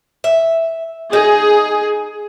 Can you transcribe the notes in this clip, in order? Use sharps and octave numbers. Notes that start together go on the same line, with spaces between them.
E5
D#4 G#4